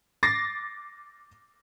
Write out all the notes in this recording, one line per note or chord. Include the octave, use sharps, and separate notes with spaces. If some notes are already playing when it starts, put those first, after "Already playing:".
D6 A6 A#6 C7